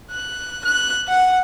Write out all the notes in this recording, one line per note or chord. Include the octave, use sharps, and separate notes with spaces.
F#6
F#6
F#5